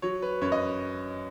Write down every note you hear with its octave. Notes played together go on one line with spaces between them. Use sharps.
F#3 C#5
B4
F#2 C#5
D#5